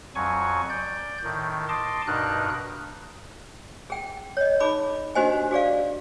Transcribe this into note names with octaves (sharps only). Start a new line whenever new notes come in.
F2 F#3 G#5 C#6
D5 G6
A2 D#3
D#5 A5 C6 D6
G2 B2 D4 D#4 A#4 F#6
G#4 G5
C#5 D#5
D#4 G#4 B5 D6
D4 F#4 G4 C5 D#5 G#5
F#4 G#4 D5 F5